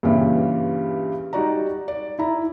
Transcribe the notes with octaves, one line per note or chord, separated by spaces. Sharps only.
G2 A#2 C#3 E3 G3
G3 D#4 F#4 D5 A#5
D5
E4 A#5